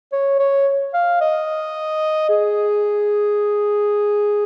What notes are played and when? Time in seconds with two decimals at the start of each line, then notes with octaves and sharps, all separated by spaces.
0.12 C#5
0.39 C#5
0.94 F5
1.21 D#5
2.29 G#4